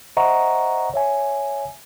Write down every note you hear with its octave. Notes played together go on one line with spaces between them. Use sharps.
C5 D#5 E5 F#5 A#5 C#6
C#5 E5 G#5